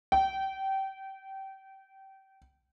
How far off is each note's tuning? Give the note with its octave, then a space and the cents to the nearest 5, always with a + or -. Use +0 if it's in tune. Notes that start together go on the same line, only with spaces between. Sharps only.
G5 -25